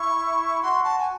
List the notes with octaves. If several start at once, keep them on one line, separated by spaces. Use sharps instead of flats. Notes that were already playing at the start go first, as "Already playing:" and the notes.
Already playing: E4 C#6
F#4 C6
A5
G#5